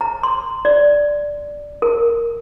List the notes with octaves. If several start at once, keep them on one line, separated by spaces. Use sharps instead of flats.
A#5
C6
D5
A#4